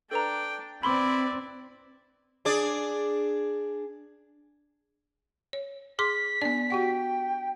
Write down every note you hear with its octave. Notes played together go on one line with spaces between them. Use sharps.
D4 A4 B4 G5 A#5
C4 E4 B4 D5 B5 C6 D6
D4 G#4 D5
C#5
G#4 C6 D6 B6
B3 D4 D5
F#4 G4 F#5 G5